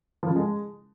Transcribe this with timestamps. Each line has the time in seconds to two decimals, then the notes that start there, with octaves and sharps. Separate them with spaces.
0.23 F3
0.29 C#3
0.36 G#3